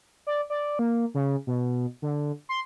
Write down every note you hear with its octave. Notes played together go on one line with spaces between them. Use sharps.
D5
D5
A#3
C#3
B2
D3
C6